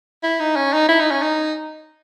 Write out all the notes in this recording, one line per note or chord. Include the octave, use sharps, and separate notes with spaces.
E4
D#4
C#4
D#4
E4
D#4
C#4
D#4